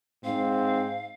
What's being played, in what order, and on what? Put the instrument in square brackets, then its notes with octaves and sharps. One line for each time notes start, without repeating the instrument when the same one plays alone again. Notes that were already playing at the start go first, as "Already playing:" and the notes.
[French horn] G#2 [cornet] C4 [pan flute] F5